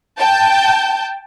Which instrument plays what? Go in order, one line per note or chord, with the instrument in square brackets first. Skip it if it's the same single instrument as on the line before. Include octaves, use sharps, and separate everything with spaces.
[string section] G5 A5 G6